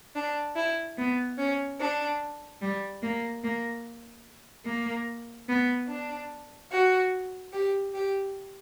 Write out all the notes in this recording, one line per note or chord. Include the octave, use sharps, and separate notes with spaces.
D4
E4
B3
C#4
D4
G3
A#3
A#3
A#3
B3
D4
F#4
G4
G4